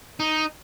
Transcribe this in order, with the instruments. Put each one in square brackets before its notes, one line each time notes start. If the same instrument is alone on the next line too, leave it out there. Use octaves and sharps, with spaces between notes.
[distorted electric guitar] D#4